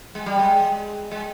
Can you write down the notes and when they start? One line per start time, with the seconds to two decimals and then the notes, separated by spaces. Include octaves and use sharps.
0.15 G#3
0.26 G3
0.39 G#3
1.11 G#3